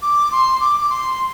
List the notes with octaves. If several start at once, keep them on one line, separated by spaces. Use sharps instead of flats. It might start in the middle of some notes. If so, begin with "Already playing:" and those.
D6
C6
D6
D6
C6